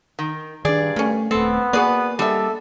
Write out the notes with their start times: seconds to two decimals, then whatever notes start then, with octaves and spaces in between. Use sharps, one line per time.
0.19 D#3
0.65 G2 D#3 D4 G#4 D5
0.96 A3 A#3 C#4
1.31 D#1 A3 B3 C4 A4
1.73 A#3 F#4 G#4 B4 D5
2.19 D3 G3 G#3 A4 E5